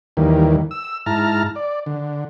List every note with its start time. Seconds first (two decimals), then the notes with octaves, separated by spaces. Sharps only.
0.17 D#2 D#3 E3 G3 A#3
0.71 E6
1.06 G#2 E4 A5 A#5 F6
1.56 D5
1.86 D3